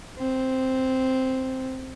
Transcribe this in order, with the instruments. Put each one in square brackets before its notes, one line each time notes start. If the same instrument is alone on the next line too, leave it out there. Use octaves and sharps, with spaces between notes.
[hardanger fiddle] C4